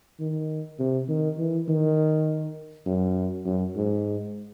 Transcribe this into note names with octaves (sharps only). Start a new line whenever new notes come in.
D#3
C3
D#3
E3
D#3
F#2
F#2
G#2